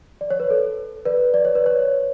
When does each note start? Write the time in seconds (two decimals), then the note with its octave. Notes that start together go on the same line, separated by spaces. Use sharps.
0.21 D5
0.30 C#5
0.40 B4
0.50 A4
1.05 B4 D5
1.34 D5
1.45 C#5
1.55 B4
1.66 C#5